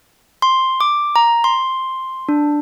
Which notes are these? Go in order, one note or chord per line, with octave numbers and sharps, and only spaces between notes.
C6
D6
A#5
C6
D4